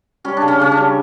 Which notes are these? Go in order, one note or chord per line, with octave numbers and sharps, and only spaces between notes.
G3 C#4
C#3 D4
C#4
C#3 C#4
D4
G3